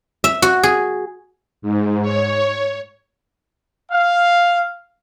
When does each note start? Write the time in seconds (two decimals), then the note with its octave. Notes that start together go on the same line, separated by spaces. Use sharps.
0.24 E5
0.42 F#4
0.63 G#4
1.62 G#2
2.02 C#5
3.92 F5